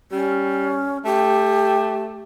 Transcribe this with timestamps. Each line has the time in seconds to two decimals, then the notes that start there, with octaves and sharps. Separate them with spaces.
0.12 G3 C#4
1.05 A3 G4